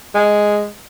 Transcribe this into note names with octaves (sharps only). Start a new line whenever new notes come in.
G#3